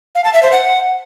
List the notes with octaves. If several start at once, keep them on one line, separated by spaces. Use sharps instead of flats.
F5
A5
E5
C5
F#5